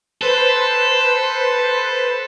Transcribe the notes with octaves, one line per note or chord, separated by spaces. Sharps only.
A4 B4 C5